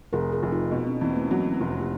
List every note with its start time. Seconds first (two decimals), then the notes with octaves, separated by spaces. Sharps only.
0.13 F1 G#4 A#4
0.32 G#4 A#4
0.43 F1
0.52 D#4 F4
0.71 B2
0.87 C4 D4
1.01 E2 A#3 C4
1.16 A3 B3
1.25 C#4
1.31 F#3 A#3 C4
1.50 A#3 C4
1.60 F1
1.71 E4 F#4
1.81 G4